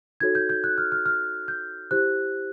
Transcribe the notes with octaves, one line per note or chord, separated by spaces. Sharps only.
D#4 F#4 A4 C#5 G#6
G6
G6
F#6
F6
F6
F6
G6
E4 G4 C5 F#6